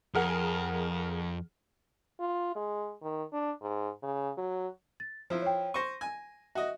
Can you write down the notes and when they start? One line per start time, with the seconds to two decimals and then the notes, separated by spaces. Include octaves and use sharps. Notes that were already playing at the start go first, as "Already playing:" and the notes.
0.15 F2 G#4 A#4 F#5
2.20 F4
2.55 G#3
3.02 D#3
3.33 D4
3.62 G#2
4.03 C#3
4.37 F#3
5.00 A6
5.30 F3 E4 C5
5.42 C#5 G5
5.74 C5 C#6 A#6 D#7
6.01 G#5
6.55 F#4 D#5 E5